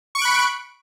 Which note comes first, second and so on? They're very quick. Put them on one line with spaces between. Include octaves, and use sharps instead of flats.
C#6 D7 F#6 B5